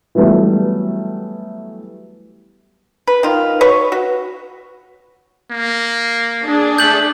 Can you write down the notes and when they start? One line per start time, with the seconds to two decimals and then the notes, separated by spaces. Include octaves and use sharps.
0.15 E3 F#3 G3 A3 B3
3.08 B4
3.23 D#3 F4
3.61 F#4 B4 C#5 C#6
3.92 F#4
5.51 A#3
6.44 D4 G#4
6.78 A3 G6 F#7